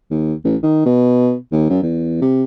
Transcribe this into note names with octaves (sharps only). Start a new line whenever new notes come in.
D#2
A1
D#3
B2
D#2
F#2
E2
C3